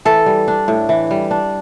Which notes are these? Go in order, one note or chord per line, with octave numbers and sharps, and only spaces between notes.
E3 A4
G3
D4
A2
E3
G3
D4